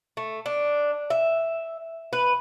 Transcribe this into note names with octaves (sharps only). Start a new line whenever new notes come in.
A3
D4
E5
B4